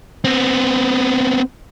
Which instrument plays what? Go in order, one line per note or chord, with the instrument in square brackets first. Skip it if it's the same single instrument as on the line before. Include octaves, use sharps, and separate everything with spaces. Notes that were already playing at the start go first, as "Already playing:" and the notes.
[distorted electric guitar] B3 C4